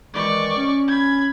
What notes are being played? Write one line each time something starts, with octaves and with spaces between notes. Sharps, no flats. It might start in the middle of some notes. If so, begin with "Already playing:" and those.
D#3 E3 G#3 D5 C#6
C#4
B5 G#6